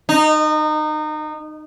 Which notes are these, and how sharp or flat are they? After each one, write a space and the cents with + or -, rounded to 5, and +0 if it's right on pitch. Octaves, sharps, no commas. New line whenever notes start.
D#4 -25